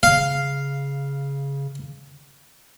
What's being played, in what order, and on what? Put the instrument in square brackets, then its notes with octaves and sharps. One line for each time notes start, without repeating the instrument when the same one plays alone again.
[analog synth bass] C#3 [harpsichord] F5